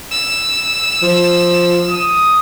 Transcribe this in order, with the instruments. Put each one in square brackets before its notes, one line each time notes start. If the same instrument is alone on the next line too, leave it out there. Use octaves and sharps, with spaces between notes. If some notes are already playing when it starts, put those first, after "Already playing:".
[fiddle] E6
[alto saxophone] F3
[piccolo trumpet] D#6